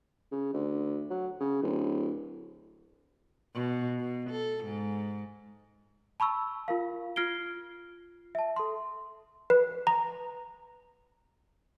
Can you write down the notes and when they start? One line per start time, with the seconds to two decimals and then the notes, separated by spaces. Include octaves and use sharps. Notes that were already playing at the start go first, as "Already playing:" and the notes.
0.32 C#3
0.53 D2
1.10 F#3
1.40 C#3
1.62 D1
3.55 B2
3.99 B2
4.31 A4
4.65 G#2
6.20 A5 B5 C#6 E6
6.68 F4 A#4 F5
7.16 F4 F6 G#6 C7 D7 G7
8.35 E5 A5
8.56 A4 C6
9.50 B4
9.87 A#5